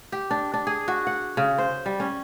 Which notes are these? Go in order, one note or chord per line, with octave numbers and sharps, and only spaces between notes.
G4
D4
D4
G#4
F#4
F#5
C#3
C5
G3
C#4